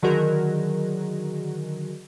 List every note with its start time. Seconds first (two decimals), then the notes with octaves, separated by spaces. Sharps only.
0.03 D3 D#3 F#3 F#4 G#4 A#4